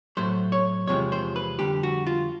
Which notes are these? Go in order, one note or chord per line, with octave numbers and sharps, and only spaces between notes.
A2 F#3 A3 C5
C#5
E2 C3 F3 G#3 C#5
C5
B4
F2 D3 G3 G4
F#4
F4